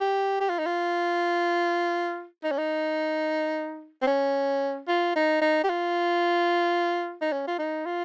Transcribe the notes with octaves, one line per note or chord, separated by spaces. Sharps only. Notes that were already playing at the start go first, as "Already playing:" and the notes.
G4
G4
F4
D#4
F4
D#4
C#4
D#4
C4
C#4
F4
D#4
D#4
G4
F4
D#4
C#4
F4
D#4
F4